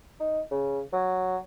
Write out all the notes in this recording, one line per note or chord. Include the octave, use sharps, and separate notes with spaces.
D#4
C#3
F#3